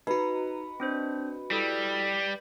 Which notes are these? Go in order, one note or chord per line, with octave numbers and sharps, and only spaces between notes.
D#4 F#4 B4 D#5 A#5
C4 D4 C5
G3 E4 A4 D#6